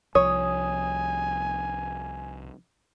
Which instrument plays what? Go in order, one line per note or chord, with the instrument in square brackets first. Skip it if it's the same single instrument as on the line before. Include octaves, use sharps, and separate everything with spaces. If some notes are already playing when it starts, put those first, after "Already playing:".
[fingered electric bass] C2 C3 F3 [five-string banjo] C#5 [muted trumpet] G#5 [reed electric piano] D#6